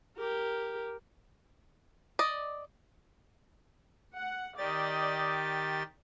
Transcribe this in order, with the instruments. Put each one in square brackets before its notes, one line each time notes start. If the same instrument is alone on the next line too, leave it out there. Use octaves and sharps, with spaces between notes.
[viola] G4 A#4
[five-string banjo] D5 D#5
[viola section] F#5
[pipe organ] D#3 G4 A6 [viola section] D5 D#5